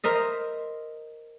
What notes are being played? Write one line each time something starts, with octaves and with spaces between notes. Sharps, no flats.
A#4 C5 D#5 E5